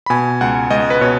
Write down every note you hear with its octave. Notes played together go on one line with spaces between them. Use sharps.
B5
B2 G#5
C#2 F#5
C#2 D#5
B4
B2 C#5